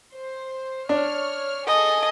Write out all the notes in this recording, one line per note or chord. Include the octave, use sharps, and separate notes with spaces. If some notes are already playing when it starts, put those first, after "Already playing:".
C5
D4 C#5 F6
G#4 A4 D#5 G#5